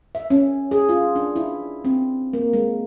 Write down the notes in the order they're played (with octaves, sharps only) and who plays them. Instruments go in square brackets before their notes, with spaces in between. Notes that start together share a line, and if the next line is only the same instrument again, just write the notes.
[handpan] E5
C#4
G#4
F4
D4
E4
C4
A#3
G#3